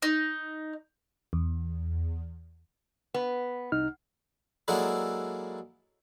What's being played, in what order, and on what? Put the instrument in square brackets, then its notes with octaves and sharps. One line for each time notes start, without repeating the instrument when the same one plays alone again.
[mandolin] D#4
[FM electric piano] E2
[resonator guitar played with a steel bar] B3
[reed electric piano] C2 D#4 F6
[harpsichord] F#3 G#3 A#3 D4 E4 A4